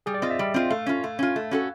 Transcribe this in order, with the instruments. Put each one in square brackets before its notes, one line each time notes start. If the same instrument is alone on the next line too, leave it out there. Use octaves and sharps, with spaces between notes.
[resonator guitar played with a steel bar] G3 [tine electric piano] G#4
[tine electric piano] D5
[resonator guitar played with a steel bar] C4 F4 [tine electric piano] D#5
[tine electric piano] E5
[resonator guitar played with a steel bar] G3
C4 F4
[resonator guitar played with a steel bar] A3 [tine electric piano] F5
[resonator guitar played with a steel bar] C#4 F4
A3
C#4 F4
A3
C#4 F#4 A4